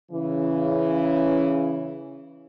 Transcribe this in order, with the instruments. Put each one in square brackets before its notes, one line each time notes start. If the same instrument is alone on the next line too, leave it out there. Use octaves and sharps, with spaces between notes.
[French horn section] C#3 E3